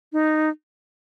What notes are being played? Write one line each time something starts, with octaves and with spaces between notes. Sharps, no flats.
D#4